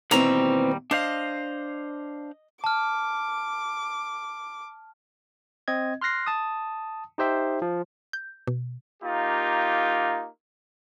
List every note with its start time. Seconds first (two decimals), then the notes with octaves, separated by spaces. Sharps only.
0.11 D#2 B2 E3 G3 C4 A#5
0.91 D4 C5 D#5 F5
2.64 A5 D6 F6
5.68 C4 D#5 G#6
6.01 C6 F6 F#6 A#6 C7
6.27 A5 D#6
7.18 D#4 G4 C5 E5 G5
7.62 F3
8.13 G6
8.47 B2
9.03 A#3 D#4 F4 G4